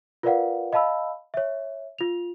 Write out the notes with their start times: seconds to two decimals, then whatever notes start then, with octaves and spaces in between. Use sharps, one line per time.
0.23 F4 A#4 B4 D5 F5 F#5
0.73 D#5 F5 A5 B5 E6
1.34 C#5 E5
1.98 F4 F7